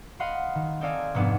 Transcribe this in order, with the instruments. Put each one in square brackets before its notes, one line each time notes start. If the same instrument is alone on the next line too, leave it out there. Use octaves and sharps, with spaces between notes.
[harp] D#5 F5 F#5 B5 C6
D#3
C4 D#4 A4 D5 F5 G#5
F1 G#2 B3 D4 G#4